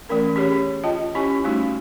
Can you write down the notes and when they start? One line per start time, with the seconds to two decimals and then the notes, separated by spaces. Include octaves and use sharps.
0.09 E3 A3 C#4 A#4
0.35 E3 C#4 G4 G#4 C#5
0.84 F4 D#5 G5 A5
1.15 C#4 E4 G4 C#5 G#5 C#6
1.44 G3 A3 C#4 D#4 F#4